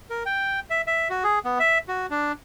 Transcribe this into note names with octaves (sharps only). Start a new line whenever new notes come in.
A#4
G5
E5
E5
F#4
G#4
B3
E5
F#4
D4